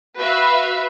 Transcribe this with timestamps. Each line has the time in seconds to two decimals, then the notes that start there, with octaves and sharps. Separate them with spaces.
0.18 F#4 B4 E5 F5